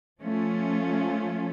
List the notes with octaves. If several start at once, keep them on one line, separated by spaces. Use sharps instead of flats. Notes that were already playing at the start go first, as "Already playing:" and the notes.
F3 A3 C#4 F4